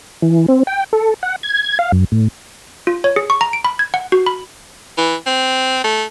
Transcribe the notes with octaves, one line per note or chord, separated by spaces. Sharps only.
E3
C4
G5
A4
F#5
G#6
F5
F#2
A2
F4
C#5
G#4
C#6
A#5
D7
B5
G#6
F#5
F#4
B5
E3
C4
A3